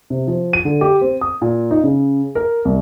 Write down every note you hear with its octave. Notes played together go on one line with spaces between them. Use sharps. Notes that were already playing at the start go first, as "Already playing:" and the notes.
C3
F3
D#7
D3
G4
C4
D#6
A#2
D#4
C#3
A#4
C2